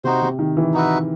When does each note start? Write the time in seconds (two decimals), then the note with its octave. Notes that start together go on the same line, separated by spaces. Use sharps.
0.04 C3 D#4 F#4 C5
0.22 C3
0.39 D#3
0.57 E3
0.74 D#4 F#4 B4 E5